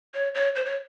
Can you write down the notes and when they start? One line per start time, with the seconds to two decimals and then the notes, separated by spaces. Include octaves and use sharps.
0.14 C#5
0.35 C#5
0.55 C5
0.65 C#5